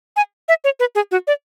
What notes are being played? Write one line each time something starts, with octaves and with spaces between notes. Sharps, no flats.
G#5
E5
C#5
B4
G#4
F#4
D5